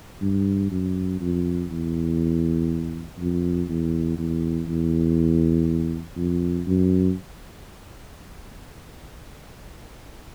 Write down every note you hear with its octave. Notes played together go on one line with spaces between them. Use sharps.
G2
F#2
F2
E2
F2
E2
E2
E2
F2
F#2